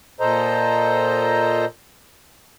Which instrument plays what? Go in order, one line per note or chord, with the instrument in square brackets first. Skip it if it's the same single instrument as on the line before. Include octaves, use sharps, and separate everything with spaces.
[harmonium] A#2 A4 C5 D#5 A#5